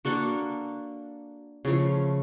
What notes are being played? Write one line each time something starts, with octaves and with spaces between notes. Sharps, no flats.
A#3 D4 F#4 A4
C#3 F3 A3